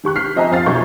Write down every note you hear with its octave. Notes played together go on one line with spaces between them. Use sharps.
D#3 G4 C#6 F#6
F6 G6 B6 C7
F3 C4 D#5 E5 G#5 A#5
F2 C4 F5 A6
B1 F#3 F4 C#5 C#6 G6